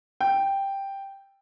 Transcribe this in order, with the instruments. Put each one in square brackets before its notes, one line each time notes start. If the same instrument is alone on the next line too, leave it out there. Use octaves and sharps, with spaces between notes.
[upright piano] G5